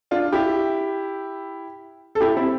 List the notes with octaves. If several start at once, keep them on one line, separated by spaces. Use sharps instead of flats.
D4 F4
E4 G4
A4
E4 G4
C4 E4